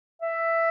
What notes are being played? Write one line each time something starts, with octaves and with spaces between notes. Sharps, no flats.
E5